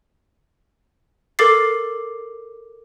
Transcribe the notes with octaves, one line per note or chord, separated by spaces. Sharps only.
A4 A#4 D6 A6 C7